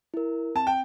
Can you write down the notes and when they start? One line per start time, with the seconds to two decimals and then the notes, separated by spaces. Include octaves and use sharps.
0.14 E4 A#4
0.55 C4 A5
0.67 G5